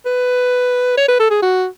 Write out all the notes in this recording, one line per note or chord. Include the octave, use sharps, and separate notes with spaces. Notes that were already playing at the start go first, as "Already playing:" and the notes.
B4
C#5
B4
A4
G#4
F#4